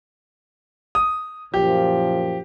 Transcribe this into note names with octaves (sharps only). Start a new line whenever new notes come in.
D#6
F#2 A#2 F3 G4